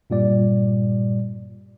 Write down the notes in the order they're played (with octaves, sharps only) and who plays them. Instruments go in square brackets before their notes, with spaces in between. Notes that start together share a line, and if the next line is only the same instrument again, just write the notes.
[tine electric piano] G2 A#2 G3 D5